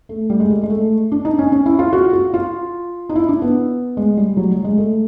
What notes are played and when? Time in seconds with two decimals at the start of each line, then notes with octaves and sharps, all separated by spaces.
0.09 A3
0.30 G3
0.40 G#3
0.50 A3
0.63 G#3
0.70 A3
1.12 D4
1.25 D#4
1.38 C#4
1.52 C#4
1.66 E4
1.79 F4
1.93 F#4
2.13 F#4
2.34 F4
3.09 D#4
3.16 E4
3.29 D4
3.42 B3
3.97 G#3
4.17 G3
4.37 F#3
4.50 G3
4.64 G#3
4.78 A3